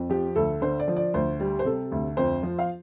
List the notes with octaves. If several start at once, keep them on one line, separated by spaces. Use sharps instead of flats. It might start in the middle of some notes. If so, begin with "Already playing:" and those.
Already playing: F2
F3 G4
D2 A4
D3 C5
D5
F3
D5
D2 C5
G3
C5
C3 A4
D2
F2 C5
F3
F5